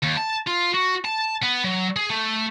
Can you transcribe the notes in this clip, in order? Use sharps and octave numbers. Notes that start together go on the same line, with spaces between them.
D#2
A5
F4
F#4
A5
B3
F#3
G#4
A3